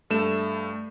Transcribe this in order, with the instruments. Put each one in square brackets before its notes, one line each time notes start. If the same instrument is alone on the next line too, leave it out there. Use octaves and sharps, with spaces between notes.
[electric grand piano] G2 A3 E7